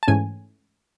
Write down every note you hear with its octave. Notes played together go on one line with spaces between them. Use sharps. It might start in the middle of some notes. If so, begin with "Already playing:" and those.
A5
G#2 E3 A3 C#4 G#5